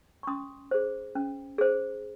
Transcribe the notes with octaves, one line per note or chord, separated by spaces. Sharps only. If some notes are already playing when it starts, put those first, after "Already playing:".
C#6
C#4 C6 D#6
G#4 C5
C#4
G#4 C5